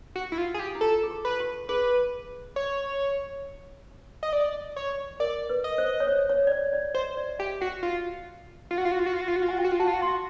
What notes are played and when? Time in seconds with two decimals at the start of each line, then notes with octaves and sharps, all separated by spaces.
0.16 F#4
0.32 E4
0.38 F4
0.54 G#4
0.60 G4
0.75 E4
0.81 F4 A4
1.03 G#4
1.11 G4
1.25 B4
1.40 G4
1.69 G#4 B4
2.56 C#5
4.23 D#5
4.33 D5
4.76 C#5
5.20 A#4 D5
5.50 B4
5.64 D#5
5.78 C5
6.00 C#5
6.07 C5
6.29 C#5
6.47 D5
6.52 C#5
6.73 D5
6.95 C5 D#5
7.17 D5
7.39 G4 E5
7.61 F#4 F#5
7.83 F4
8.71 F4
8.78 F#4
8.85 F4
8.92 F#4
8.99 F4
9.06 F#4
9.14 F4
9.21 F#4
9.28 F4
9.36 F#4
9.43 F4
9.48 F#4 G#5
9.58 F4 G5
9.64 F#4
9.72 F4
9.80 F#4 A5
9.88 F4
9.94 F#4
10.01 F4 C6
10.08 F#4